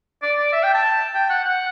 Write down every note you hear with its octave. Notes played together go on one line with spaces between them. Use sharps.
D5
D5
E5
G5
A5
G5
F#5
F#5